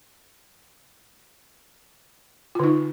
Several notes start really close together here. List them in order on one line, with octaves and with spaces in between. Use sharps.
F4 D3 D#4